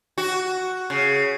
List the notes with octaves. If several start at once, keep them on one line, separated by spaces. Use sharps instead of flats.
F#4
C#3